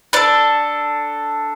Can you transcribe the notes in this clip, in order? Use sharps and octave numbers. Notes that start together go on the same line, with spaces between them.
D4 A4 B4